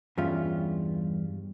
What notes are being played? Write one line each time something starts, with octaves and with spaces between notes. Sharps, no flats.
E2 G2 G3 C#4 F4 E5